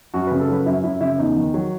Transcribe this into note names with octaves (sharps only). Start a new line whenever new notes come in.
F#2 F#4
C#3 B4
A4
F#3 B4
F#2 E4
F#2 E4
C#3 E4
E2 D#4
D#3
F#3